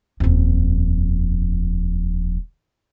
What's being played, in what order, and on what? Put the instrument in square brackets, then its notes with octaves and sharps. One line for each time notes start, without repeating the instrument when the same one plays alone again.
[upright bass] D#1 F2